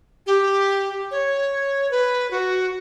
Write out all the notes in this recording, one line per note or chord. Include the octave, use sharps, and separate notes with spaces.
G4
C#5
B4
F#4